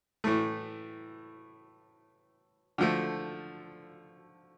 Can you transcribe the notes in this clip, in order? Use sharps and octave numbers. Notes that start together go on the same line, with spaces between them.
A2 E3 A3
D3 F3 A3